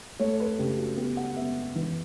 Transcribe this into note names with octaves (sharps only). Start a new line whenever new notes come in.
A3 C#5
B4
C#3 G4
F#4
B3 G4
F#5
B3 E5
E3